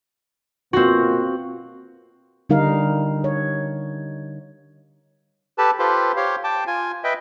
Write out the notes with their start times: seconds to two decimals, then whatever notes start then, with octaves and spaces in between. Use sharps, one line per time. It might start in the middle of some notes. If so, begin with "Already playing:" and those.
0.73 B2 A#3 C4 F4 F#4
2.49 D3 G3 D#4 A#4 F5
3.24 C#5
5.58 G4 A4 B4 A5
5.79 F4 G4 A4 B4 C5
6.17 G4 C5 C#5 F5
6.44 G5 A5 D6
6.67 F4 G#5
7.04 B4 D#5 E5 G5